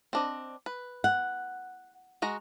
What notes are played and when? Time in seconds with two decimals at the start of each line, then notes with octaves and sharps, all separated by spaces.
0.13 C4 D4 D#5
0.66 B4
1.04 F#5
2.22 G#3 F#4 A#5